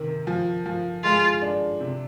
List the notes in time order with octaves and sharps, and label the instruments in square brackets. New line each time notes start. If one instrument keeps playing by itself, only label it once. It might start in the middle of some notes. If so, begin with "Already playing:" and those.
Already playing: [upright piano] C3 D#3
F3
F3
[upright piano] G#3 [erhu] F4
[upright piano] D4
C3